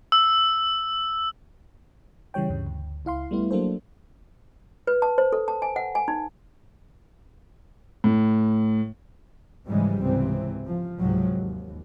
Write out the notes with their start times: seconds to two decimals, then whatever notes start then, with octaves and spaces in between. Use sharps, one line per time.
0.12 E6
2.34 C#3 E3 G3 C#5 G5
2.49 D2 G2 C#3
2.66 D2
3.05 C#2 E4 F5 C6
3.31 G3 A3 B3 E4
3.51 F#3 A#3 D4 A4 C5
4.87 B4
5.02 A5
5.18 C5
5.33 A4
5.48 A5
5.62 G#5
5.76 F#5
5.95 G#5
6.08 D#4
8.04 A2
9.67 G#2 C#3 E3 F3 G3 G#3
10.01 C#2 G#2 C3 E3 C4
10.66 F3
11.01 C#2 G#2 C3 F3 F#3
11.38 D#2